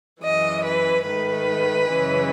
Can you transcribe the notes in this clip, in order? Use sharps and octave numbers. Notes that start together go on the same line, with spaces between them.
F#2 E3 G#3 D#5
B4
G#2 D#3 A3 B4
F#2 C#3 E3 G#3